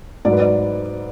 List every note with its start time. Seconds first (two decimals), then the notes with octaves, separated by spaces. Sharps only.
0.25 G#2 F#3 D5
0.32 B4
0.40 D5